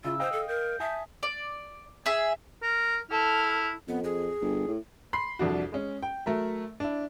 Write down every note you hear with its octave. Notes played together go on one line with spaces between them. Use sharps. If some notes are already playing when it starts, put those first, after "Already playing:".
C#3 E4 F4 E6
C5 D#5 F5 G5
A4
A#4 G6
E5 G#5 A5 D#6
D5
G#4 E5
A#4
E4 A4 F6
F2 B3
G#4
G1
A2
B5 C6 C7
C2 F2 D4 F#4
G#3 C#4
G5
F#3 A3 A#4 E5
D4 E4